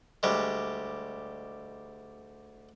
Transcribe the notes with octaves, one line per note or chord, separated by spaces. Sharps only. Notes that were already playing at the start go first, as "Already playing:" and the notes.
D2 G3 G#3